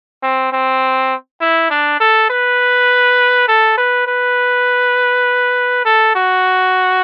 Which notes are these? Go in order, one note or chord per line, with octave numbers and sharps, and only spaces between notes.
C4
C4
E4
D4
A4
B4
A4
B4
B4
A4
F#4